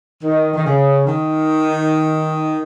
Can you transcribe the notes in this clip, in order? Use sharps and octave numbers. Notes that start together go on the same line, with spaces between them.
D#3
D#3
C#3
D#3